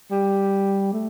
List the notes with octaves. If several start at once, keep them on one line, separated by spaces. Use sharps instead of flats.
G3
A3